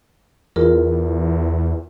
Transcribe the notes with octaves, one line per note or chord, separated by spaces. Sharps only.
E2 F4 G#4 A#4